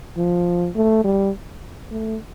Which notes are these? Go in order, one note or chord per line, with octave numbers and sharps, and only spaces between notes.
F3
A3
G3
A3